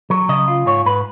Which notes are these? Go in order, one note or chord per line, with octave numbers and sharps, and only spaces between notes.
F#3
C#3 D#5
F4
G#2 C#5
G#2 B4